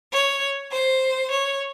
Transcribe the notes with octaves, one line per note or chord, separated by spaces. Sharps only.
C#5
C5
C#5